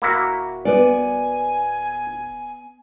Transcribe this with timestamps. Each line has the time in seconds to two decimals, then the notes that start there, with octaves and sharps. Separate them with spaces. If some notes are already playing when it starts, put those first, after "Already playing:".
0.02 D1 A#3 E4 F#4
0.65 B3 D5 G#5